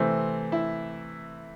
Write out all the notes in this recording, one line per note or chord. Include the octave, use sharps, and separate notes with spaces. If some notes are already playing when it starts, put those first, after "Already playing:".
Already playing: C3 E3 A3 C4 C5
E4